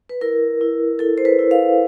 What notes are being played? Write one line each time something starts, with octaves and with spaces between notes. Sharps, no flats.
B4
E4 A#4
E4
E4 A4
C5
B4
E4
F5